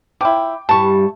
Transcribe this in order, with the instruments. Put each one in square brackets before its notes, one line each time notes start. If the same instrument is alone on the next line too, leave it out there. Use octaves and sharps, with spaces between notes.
[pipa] F3 E4 [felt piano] G5 [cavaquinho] D6
[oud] G2 G3 [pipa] E3 [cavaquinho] A5 C#6